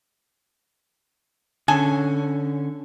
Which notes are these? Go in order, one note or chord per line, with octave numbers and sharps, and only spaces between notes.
D3 C#4 G#4 A4 G#5